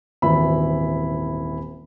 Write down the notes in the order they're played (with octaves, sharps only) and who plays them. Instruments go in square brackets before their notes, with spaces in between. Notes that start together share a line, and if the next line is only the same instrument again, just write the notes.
[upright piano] D#1 G#1 E3 E4 B5